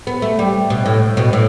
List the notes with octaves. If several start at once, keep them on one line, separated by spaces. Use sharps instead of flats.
B3
A3
G3
B2
A2
B2
A2